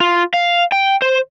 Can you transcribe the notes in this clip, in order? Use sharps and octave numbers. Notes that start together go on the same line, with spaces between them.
F4
F5
G5
C5